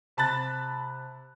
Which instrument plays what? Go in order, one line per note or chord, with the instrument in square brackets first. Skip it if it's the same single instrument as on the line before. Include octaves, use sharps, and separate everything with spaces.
[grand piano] C3 A5 B5 F#6 A6